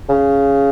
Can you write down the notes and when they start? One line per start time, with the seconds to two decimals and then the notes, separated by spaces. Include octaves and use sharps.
0.09 C#3